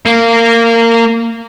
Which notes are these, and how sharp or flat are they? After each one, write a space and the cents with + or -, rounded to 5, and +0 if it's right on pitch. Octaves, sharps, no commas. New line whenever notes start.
A#3 -20